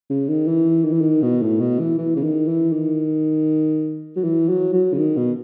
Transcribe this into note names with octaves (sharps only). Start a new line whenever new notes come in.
C#3
D#3
E3
D#3
E3
D#3
B2
A2
B2
E3
E3
C#3
D#3
E3
D#3
F#3
E3
F#3
F#3
C#3
D#3
B2